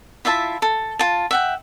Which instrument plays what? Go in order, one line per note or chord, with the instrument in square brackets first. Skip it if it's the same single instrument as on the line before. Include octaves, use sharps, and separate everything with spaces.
[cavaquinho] E4 F4 E5 A5
A4
F4 A5
E5 F#5 G5